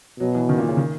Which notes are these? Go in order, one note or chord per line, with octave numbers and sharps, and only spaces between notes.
B2 F#3
E3
D#3
A#2
C#3
D#3